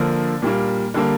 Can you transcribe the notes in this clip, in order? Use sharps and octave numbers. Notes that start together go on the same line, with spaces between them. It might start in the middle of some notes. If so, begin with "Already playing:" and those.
Already playing: D3 F3 A#3 D4
A#2 G3 A#3
D3 G3 A#3